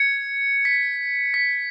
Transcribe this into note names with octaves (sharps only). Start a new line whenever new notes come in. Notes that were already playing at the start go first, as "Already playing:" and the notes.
Already playing: G#6 C#7
B6
B6